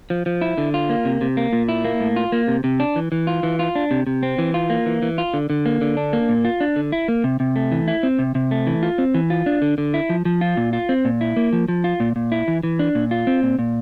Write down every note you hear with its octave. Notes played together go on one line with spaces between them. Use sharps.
F3
F3
E4
D3
F4
A#3
C3
C3
A#3
A#2
E4
A#3
A2
F4
A#3
C3
C3
D4
E3
E3
F4
E3
F4
D4
C3
C3
C4
E3
F4
A#3
E3
E3
F4
D3
D3
A#3
D3
D4
A#3
A#2
F4
D4
D3
E4
A#3
C3
C3
A3
E3
E4
C4
C3
C3
A3
E3
F4
C4
E3
F4
D4
D3
D3
E4
F3
F3
F4
A#2
F4
C4
A#2
E4
A#3
F3
F3
F4
A#2
A#2
E4
E3
E3
D4
A#2
F4
C4
A#2
A#2